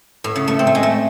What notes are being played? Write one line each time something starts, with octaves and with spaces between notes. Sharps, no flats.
A2
C#3
A3
C4
A3
G#3
A3